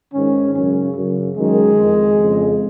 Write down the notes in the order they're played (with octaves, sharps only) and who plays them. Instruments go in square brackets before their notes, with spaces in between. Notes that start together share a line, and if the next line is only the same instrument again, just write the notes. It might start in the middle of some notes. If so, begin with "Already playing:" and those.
[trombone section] G#2 D#3 C#4
F#2 C#3 C#4
F#2 C#3
F#2 D#3 G#3
F2 D#3
F2 C#3